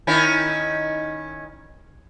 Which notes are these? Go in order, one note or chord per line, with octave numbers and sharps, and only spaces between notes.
D#3 C#4 E4